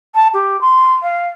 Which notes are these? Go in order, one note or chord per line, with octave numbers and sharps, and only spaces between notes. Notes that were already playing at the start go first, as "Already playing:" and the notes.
A5
G4
C6
F5